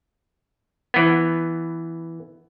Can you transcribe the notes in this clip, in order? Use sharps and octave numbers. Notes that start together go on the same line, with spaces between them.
E3 B3